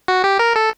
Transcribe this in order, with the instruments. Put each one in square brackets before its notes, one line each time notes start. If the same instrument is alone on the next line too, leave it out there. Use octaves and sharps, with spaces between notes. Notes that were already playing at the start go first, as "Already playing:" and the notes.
[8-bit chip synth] F#4
G4
A#4
A4